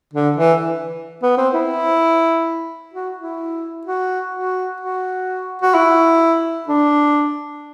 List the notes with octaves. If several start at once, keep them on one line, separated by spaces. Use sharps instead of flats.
D3
E3
B3
C4
E4
F#4
E4
F#4
F#4
F#4
F#4
E4
D4